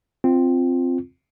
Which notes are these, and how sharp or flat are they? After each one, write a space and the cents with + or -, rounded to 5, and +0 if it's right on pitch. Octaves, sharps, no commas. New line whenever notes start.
C4 +0 F4 +0